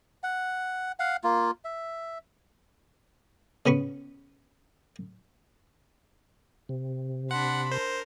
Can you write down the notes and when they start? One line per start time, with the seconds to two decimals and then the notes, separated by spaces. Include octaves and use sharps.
0.23 F#5
1.00 F5 F#5
1.24 A#3 F4
1.65 E5
3.66 C#3 B3 B5 C#6
6.69 C3
7.31 D4 F#5 B5 C6
7.71 A#4 C5